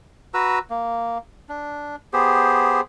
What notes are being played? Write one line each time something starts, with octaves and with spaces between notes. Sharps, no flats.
F#4 B4 A#5 E6
A#3
D4
B3 G4 G#4 C5